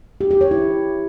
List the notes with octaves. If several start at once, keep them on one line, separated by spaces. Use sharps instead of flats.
G4
G4
C#5
E4